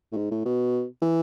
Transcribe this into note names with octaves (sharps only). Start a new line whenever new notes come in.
A2
G#2
A2
B2
E3